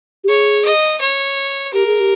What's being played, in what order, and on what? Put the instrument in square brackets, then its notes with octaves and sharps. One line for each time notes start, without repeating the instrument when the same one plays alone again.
[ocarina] G4
[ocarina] G#4 [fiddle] C#5
[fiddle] D#5
C#5
[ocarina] G4 [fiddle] A#4
[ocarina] G#4
G4